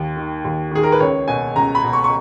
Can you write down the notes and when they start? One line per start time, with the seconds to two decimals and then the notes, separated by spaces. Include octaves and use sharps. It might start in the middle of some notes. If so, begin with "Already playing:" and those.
Already playing: D#2
0.16 D#3
0.45 D#2
0.71 D#3 G#4
0.83 A#4
0.92 B4
1.00 C#2 C#5
1.28 B2 G#5
1.56 C#2 A#5
1.75 B5
1.83 B2
1.93 C#6
2.04 C#6